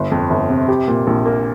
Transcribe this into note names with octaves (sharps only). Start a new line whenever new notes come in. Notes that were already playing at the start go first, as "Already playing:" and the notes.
Already playing: G1
F2
G1
C3
G4
A#2
A#1
A#3